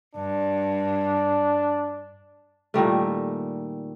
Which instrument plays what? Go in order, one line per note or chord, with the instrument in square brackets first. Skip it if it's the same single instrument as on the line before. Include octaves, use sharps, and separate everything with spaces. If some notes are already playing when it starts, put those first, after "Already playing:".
[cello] G2 [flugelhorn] D4
[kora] A#2 D#3 G3 A3